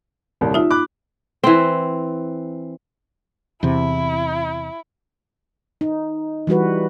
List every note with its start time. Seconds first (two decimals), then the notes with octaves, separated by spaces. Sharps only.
0.41 D#1 C2
0.54 D#4 F4 E5
0.70 B5 D6 F#6
1.44 E3 C4
3.63 E2 C3 E4
5.81 D#4
6.47 E3 G3 F#4 B4